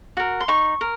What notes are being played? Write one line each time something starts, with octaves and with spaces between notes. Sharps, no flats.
F#4 A#4
C6
D#4 C#6
A#4